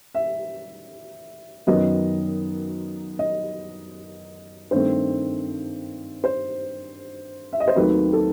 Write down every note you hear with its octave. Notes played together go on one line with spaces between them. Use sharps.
E5
F#2 D#3 F#3 B3 D#5
D#5
G2 D#3 A3 C4 C5
C5
E5
D#5
C5
D#2 D#3 F#3 A3 C4 B4
A4